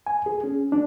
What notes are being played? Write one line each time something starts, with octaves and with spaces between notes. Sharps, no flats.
G#5
G#4
C#4
D4